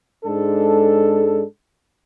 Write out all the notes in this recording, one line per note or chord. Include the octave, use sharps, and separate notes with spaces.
G#2 G#3 D4 A4